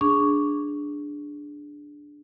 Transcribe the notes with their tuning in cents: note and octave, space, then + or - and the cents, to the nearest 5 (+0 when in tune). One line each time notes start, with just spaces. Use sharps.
D4 +0 G#4 +0 C#6 +5